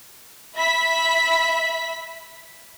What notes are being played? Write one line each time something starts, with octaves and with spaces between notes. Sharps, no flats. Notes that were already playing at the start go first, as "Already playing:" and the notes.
E5 B5 B6